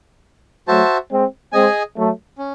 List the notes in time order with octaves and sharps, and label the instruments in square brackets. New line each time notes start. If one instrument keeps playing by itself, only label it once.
[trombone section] F#3 A3 [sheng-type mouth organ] F#4 C5 E5 A5
[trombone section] G#3 C4
[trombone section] G#3 C4 [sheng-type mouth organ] G#4 D#5 G#5
[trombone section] F#3 A3
[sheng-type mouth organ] C#4